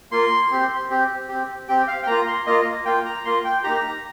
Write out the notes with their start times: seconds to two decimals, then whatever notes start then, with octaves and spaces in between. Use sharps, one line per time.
0.12 A#3 F4 C6
0.51 C4 G4
0.90 C4 G4
1.29 C4 G4
1.68 C4 G4 G5
1.88 F5
2.03 G5
2.07 A#3 F4 A#5
2.27 C6
2.47 A#3 F4 D#5
2.85 A#3 F4 G5
3.05 A#5
3.25 A#3 F4 C6
3.44 G5
3.64 A#3 D#4 G4 A#5